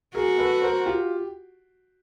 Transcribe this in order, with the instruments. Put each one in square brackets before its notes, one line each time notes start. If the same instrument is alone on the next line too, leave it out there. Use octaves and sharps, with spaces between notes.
[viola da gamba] F#4 [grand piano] G#4 A#4
[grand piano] A4 B4
A#4 C5
F4 G4